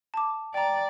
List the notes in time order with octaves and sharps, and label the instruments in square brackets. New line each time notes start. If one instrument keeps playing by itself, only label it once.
[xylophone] A5 D6
[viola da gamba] D5 [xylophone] G5 A#5